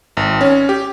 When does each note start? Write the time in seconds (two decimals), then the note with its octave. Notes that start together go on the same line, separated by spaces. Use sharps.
0.17 G#1
0.41 C#4
0.69 G4